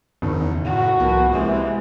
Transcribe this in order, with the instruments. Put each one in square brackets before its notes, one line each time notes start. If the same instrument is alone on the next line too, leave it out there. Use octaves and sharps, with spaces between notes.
[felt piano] F#1 D#3 [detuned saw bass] E2
[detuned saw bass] A2 [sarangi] F#4
[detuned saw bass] C2 [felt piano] F3 A#3 B3
[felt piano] C3 C4 [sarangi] E3 [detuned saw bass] G#3